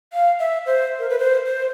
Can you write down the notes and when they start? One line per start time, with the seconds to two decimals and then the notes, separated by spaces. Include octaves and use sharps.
0.13 F5
0.39 E5
0.66 C5
0.99 A#4
1.10 B4
1.19 C5
1.46 C5